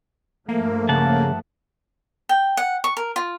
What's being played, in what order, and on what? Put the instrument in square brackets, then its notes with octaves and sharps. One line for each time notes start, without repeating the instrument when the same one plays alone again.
[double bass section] G2 F3 A3 [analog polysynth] A#3
[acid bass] C#3 [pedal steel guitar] F#5 A5
[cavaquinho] G5
F#5
C#6
A#4
F4